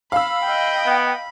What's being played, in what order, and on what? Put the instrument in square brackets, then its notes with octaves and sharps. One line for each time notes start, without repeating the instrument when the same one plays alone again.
[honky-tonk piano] F5 E6 [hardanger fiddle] B5
[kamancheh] D#5 G5
[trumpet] B3